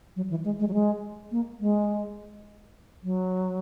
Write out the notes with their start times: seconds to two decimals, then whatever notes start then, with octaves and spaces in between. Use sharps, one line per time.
0.16 F#3
0.30 E3
0.45 G#3
0.60 G#3
0.68 F#3
0.74 G#3
1.31 A#3
1.60 G#3
3.04 F#3